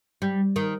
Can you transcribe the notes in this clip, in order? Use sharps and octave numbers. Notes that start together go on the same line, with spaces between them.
G3
D#3